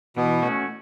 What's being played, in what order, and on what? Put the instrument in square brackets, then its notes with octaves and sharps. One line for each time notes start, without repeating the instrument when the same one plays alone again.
[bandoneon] B2 B3 [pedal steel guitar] E3
[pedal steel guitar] A3 C#4 F#4